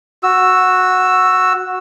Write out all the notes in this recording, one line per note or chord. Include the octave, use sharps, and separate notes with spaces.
F#4 E6